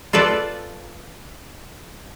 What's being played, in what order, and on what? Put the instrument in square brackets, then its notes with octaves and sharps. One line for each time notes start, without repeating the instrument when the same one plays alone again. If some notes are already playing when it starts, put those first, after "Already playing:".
[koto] F4 A4 B4 D5